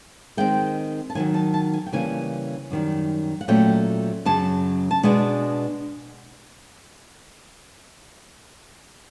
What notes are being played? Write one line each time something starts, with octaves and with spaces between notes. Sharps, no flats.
D#3 G#3 C4 G5
A5
G#2 D#3 F#3 G#5
A5
A5
G#5
G5
C#3 E3 G3 A#3 C#4 G#5
F#2 D#3 G3
F#5
A#2 F#3 A3 C#4 G5
F#2 C#3 F#3 A5
A5
B2 G#3 B3 D4 G#5